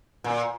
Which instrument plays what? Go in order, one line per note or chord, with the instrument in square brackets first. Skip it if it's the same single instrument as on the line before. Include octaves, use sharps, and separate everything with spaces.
[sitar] A#2